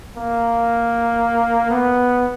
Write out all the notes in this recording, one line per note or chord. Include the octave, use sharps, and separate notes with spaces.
A#3
B3